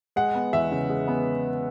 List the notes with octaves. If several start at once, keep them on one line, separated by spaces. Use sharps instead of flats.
G#3 F#5
B3
E2 E5
C#3
G#3
B3